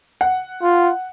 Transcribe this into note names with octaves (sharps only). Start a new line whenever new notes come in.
F#5
F4